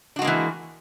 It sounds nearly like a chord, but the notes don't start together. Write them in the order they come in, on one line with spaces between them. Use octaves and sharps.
D4 F#4 G#3 A#3 E3